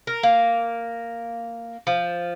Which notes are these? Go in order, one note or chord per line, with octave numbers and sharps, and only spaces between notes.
A#4
A#3
F3